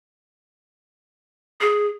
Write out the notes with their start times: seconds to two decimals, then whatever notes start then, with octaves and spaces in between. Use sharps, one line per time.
1.61 G#4